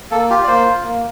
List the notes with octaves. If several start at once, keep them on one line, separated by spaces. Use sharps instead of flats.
A#3 A4
F4 G4
D5
A#3 C5
F4
A#3